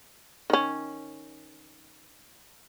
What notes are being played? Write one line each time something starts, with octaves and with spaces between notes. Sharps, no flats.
D#3 C#4